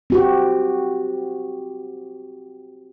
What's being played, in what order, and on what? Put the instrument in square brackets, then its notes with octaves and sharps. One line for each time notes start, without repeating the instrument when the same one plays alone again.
[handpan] C4 F#4 G4